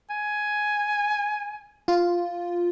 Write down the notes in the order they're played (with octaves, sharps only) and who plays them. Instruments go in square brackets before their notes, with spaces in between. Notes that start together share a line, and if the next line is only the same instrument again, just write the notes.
[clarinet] G#5
[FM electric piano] F4